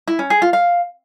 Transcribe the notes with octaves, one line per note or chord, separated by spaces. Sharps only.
E4
C#4
G#4
F4
F5